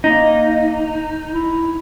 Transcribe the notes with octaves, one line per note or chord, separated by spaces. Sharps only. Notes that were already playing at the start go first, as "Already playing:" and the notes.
A#3 D#4
E4